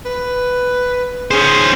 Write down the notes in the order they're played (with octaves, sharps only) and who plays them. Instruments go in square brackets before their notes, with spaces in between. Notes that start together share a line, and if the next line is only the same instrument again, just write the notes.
[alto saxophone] B4
[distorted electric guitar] C#4 C5 [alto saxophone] G#4